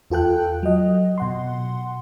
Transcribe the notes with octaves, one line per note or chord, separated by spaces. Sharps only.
E2 F4 A4 G5 F#6
F#3 D#5
B2 F#5 C6